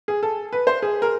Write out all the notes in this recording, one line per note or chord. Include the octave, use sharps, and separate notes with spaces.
G#4
A4
B4
C5
G#4
A#4